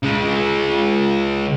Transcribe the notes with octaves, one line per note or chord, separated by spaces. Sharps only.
C#3 G#3